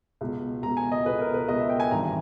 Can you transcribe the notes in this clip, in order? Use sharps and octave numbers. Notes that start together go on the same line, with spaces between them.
C#2 B2
C#2 B2 A#5
G#5
D#5
C#2 B2 B4
A#4
B4
C#2 B2 D#5
E5
G5
G#5
G#1 G2 E3 A#5